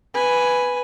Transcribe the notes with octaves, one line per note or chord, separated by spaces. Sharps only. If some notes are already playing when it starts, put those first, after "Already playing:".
B4 G#5